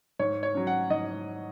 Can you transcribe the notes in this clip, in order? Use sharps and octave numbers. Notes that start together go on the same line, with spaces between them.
G#2 C#5
C#5
F#3 C#4
F#5
G#2 D#5